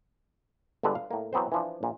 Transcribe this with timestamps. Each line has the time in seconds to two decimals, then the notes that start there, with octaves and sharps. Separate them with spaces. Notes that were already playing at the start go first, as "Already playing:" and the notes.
0.83 G1 G2 D3 G#3 B4 D5
0.95 F5
1.11 A2 A#3
1.33 E3 F#3 B3 C4 C5
1.52 E3 F3 D4
1.83 A#1 A#2